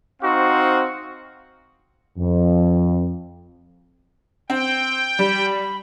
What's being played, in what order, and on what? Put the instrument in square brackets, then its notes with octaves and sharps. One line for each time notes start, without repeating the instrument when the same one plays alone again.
[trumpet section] C4 D#4 F#4 C5 F5
[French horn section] F2
[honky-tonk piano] C4 [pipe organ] G5
[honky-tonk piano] G3 [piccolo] B5